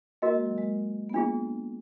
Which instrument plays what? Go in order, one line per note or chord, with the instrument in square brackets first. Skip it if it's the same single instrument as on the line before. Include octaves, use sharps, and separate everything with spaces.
[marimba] A#3 [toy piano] F#4 A#4 D#5
[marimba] G#3
F#3
G#3
B3
[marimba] A#3 [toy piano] D4 F4 G#4